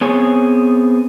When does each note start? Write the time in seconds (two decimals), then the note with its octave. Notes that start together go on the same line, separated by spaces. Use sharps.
0.01 B3 C4 G#4 C#5